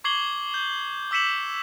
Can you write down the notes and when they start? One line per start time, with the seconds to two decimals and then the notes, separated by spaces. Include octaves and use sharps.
0.04 C#6 D6 G#6 C7 F#7 G7
0.54 G6
1.11 D6 E6 B6 C#7 E7 F#7